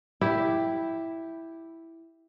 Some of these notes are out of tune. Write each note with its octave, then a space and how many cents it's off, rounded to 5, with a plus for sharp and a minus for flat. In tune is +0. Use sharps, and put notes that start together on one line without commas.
E4 +0 G4 +0